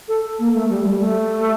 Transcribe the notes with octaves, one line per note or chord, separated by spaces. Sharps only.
A4
A#3
A3
G3
G3
A3